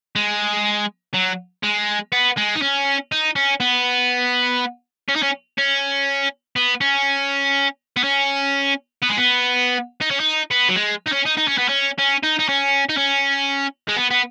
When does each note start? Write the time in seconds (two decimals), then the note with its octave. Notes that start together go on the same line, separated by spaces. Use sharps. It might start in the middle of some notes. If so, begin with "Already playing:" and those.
0.16 G#3
1.14 F#3
1.63 G#3
2.12 B3
2.37 G#3
2.55 D#4
2.62 C#4
3.12 D#4
3.36 C#4
3.60 B3
5.08 C#4
5.16 D#4
5.23 C#4
5.58 C#4
6.56 B3
6.81 C#4
7.97 B3
8.04 C#4
9.03 B3
9.10 G#3
9.18 B3
10.01 D#4
10.11 C#4
10.20 D#4
10.51 B3
10.69 F#3
10.76 G#3
11.06 D#4
11.12 C#4
11.25 D#4
11.37 D#4
11.48 C#4
11.58 B3
11.69 C#4
11.99 C#4
12.23 D#4
12.39 D#4
12.49 C#4
12.89 D#4
12.97 C#4
13.88 G#3
13.96 B3
14.10 B3